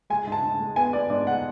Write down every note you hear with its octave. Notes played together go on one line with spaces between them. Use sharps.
G#3 G#5
G#2
A5
G#2
G#3
B3 G#5
B3 D5
G#2 D5
F#5